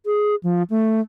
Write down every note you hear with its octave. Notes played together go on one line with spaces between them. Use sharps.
G#4
F3
A3